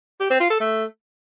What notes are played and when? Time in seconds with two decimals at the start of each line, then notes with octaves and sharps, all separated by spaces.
0.20 G4
0.30 C4
0.40 F4
0.50 A4
0.60 A3